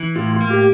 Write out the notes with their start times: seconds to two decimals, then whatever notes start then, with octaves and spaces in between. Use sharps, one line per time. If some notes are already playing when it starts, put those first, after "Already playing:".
Already playing: E3
0.16 A2 F4
0.33 F4
0.41 A#3
0.50 G4